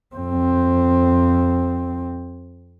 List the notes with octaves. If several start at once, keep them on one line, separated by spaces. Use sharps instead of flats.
F2 C4